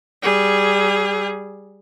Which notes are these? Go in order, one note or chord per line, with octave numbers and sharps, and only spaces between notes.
G3 G#4